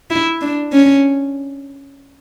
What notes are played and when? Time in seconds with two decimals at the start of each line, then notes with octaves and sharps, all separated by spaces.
0.11 E4
0.41 D4
0.73 C#4